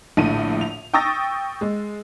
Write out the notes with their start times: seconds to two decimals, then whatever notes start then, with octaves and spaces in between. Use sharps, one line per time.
0.17 A#1 A2 D3 D#7
0.61 F7
0.94 G5 C#6 D#6 E6 A6 A#6
1.61 G#3